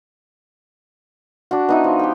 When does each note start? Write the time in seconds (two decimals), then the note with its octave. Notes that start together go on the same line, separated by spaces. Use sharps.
1.51 D4 F#4
1.69 B3 D#4 E4
1.84 F3
1.99 G4 G5